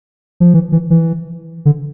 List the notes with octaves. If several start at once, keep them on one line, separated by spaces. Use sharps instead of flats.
F3
E3
E3
E3
D3